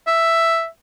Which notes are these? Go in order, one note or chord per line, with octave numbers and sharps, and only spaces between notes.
E5